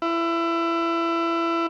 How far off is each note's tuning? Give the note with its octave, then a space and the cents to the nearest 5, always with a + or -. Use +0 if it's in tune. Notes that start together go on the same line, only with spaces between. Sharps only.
E4 +25